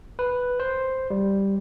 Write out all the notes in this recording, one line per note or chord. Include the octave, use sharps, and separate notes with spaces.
B4
C5
G3